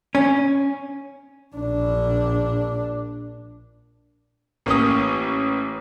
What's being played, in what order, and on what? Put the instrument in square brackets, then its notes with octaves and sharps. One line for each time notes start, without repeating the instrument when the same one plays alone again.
[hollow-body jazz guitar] C#4
[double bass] A#1 D4
[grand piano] A1 A#3 C#4 D#6